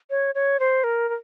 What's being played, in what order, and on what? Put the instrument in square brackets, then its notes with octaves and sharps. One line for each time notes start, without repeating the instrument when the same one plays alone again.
[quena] C#5
C#5
C5
A#4
A#4